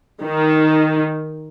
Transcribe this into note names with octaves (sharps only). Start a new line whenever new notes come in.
D#3